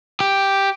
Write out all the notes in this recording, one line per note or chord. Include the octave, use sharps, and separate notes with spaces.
G4